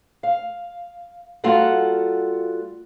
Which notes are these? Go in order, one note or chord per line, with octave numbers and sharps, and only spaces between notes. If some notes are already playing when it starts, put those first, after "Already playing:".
F5
G3 A#3 F4 F#4 A4 F#5